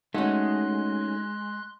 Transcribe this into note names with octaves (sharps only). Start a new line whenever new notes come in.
G#3 A3 C#4 D#4 F#4 C6 F#6